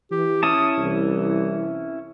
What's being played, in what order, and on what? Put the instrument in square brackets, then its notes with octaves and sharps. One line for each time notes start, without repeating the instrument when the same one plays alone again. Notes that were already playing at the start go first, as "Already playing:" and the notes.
[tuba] E3 [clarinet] G4
[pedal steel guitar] C#4 E4 A5 [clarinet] D#6
[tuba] C2 [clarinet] E3